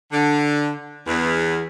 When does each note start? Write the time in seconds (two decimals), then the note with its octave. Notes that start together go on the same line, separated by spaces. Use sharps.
0.12 D3
1.07 E2